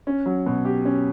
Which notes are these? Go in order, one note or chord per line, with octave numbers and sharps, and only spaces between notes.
C#4
F#3
B2
G4
C#4